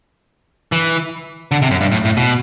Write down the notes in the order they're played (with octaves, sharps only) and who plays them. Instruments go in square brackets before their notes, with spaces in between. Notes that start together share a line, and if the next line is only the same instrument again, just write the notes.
[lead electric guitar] E3
D3
C3
F#2
G2
A2
A2
B2